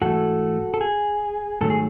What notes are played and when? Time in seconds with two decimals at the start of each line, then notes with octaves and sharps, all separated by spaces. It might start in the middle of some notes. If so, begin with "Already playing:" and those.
0.01 G#2 E3 A3 F#4 A4
0.74 A4
0.81 G#4
1.61 G#2 D#3 F#3 A3 A4
1.70 G#4